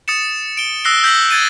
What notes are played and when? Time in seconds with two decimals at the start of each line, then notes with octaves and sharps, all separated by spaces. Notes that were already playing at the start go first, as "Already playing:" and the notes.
0.08 D#6 A6 C#7 E7
0.57 D7 G7
0.85 D#6 E6 F#6 A#6 C7 G7
1.03 E6 G6 A#6 B6 F#7
1.31 G#6 A6 D#7